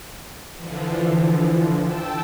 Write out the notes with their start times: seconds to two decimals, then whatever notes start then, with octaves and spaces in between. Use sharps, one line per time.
0.57 D3 E3 F3
1.84 G5 A5 E6